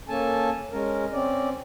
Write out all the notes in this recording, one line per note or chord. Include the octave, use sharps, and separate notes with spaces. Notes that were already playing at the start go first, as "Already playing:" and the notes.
A#3 C#4 A4 G#5 A5
G#3 C#4 A#4
C4 C#4 D5